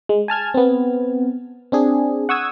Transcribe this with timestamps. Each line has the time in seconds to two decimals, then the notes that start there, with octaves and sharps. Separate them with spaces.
0.09 G#3
0.28 G#5 A5 F6 G#6
0.54 B3 C4
1.72 C4 D4 G#4
2.29 F#5 C#6 D#6 E6 G#6